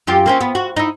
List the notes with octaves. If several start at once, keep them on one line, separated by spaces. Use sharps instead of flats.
F#2 F4 G4
A#3 C4 C#4
B3
F#4
D#4 E4